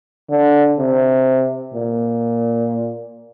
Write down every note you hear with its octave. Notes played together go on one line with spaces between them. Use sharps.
D3
C3
A#2